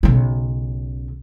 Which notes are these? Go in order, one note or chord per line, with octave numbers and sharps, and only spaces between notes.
B1 C#3